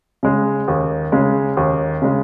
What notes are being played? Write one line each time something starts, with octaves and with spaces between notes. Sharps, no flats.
C#3 G#3
D#2
C#3 G#3
D#2
C#3 G#3